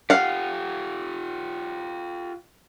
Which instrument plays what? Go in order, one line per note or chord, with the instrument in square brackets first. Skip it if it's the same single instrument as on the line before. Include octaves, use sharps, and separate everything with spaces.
[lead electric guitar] F4 G4 [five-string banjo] F5 F#5